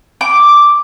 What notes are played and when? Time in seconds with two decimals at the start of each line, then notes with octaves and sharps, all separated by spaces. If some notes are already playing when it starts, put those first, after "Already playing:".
0.21 D6